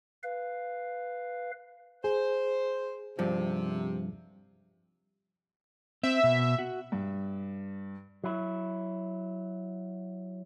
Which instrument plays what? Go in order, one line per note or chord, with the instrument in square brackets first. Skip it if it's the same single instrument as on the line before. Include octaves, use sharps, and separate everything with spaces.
[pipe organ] B4 F5
[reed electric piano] G#4 [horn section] C5
[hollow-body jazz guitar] G2 F3 [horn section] C3
[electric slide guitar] C4 [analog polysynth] E5
[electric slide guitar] B2
F#4
[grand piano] G2
[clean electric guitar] F#3 E4